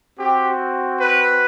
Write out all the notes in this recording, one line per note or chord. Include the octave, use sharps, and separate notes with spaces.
C4 F#4 G4
B4